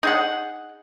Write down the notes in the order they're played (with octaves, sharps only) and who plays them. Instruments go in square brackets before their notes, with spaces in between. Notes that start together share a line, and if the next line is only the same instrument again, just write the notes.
[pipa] D#4 G#4 F#5